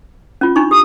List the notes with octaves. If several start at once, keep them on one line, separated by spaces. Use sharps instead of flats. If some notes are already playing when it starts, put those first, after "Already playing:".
C#4 F4
D4 D#4 C#6
G4 D#6